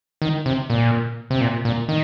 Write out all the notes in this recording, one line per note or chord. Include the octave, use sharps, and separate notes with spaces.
D#3
C3
A#2
C3
A#2
A#2
D#3